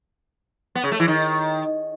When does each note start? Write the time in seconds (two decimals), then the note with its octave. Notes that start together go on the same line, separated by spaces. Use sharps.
0.75 B3
0.84 C#3
0.92 A3
1.00 E3
1.08 D#3